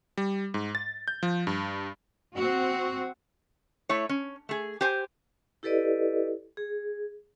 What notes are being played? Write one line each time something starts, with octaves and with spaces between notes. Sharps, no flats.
G3
G#2
A6
G6
F3
G2
C4 F#4
A3 E4 C#5
C#4
A3 G#4
G4 C5 G#5
E4 G4 A4 B4 D5 D#5
G#4